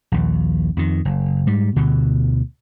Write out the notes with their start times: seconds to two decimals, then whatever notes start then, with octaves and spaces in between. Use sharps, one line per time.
0.12 A#1 D#2
0.77 F2 D#3
1.05 F#1
1.47 G#2 G3
1.76 D2 B2 D3